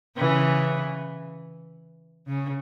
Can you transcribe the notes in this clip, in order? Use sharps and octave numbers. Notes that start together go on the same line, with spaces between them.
C#3 E3
C#3